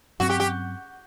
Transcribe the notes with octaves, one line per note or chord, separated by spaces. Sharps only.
G2 F#3 C4 F#4
G4
G4